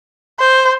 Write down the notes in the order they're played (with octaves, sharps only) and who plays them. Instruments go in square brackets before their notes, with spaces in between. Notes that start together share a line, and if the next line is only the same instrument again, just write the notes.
[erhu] C5